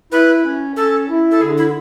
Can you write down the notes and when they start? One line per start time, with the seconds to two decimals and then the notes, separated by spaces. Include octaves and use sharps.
0.12 E4 B4
0.44 C#4
0.76 C#4 A4
1.09 E4
1.31 A4
1.41 D3 G#4
1.58 E4